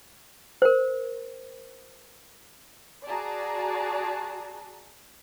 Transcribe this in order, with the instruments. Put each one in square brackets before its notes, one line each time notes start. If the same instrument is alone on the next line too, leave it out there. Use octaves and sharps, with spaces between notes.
[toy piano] A#4 C5
[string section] F#4 G#4 D5 A5 A#5